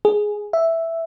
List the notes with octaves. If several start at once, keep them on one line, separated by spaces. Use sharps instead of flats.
G#4
E5